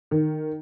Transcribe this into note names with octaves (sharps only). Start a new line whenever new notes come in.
D#3